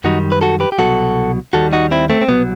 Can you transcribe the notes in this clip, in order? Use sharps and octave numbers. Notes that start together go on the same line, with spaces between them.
F#2 D#3 G3 D#4 F#4
B4
F#4 A4
G4 B4
G4
C2 B2 F#3 F#4 A4
D#2 D#3 G3 F#4 A4
D#4 F#4
C4 E4
A3 C4
C4
C2 B2 F#3 B3